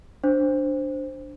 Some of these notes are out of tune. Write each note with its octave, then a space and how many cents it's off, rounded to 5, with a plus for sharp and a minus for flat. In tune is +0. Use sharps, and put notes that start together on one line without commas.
D4 +0 C5 +0